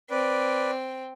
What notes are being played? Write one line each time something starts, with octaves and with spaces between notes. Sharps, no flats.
C4 B4 D5